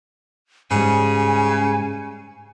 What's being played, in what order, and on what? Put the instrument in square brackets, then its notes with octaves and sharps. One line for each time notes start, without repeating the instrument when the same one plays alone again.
[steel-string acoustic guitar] G#2 G3 [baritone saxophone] C#3 [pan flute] G#5